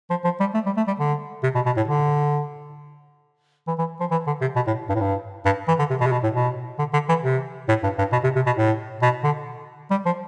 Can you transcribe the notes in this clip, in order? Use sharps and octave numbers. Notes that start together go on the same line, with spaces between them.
F3
F3
G3
A3
G3
A3
G3
D3
C3
B2
B2
A2
D3
E3
E3
F3
E3
D3
C3
B2
A2
G2
A2
G2
G2
E3
D3
C3
B2
C3
B2
A2
B2
D3
D3
E3
C3
A2
G2
G2
B2
C3
C3
B2
A2
B2
D3
G3
F3